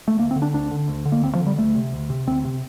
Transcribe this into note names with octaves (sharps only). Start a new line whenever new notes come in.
A3
D2 A#3
C4
D3
D4
D2 D4
D3
D2
D3
A#3
D2 C4
F3
D3
G3
D2 A3
C3
D2
C3
D2 C4
C3